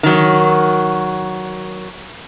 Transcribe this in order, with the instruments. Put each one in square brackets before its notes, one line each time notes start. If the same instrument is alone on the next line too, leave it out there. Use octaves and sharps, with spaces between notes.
[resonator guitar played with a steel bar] D#3 F#3